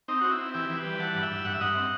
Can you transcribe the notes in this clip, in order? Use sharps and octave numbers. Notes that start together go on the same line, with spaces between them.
C4 D#4
C4 F#4
E4
C4
E3 E4 G4
E3
G4 B4
G3
E3 F#5 A5
G2
E5 G5
G2
G2 F#5
E5
G2 D#5 F#5
C4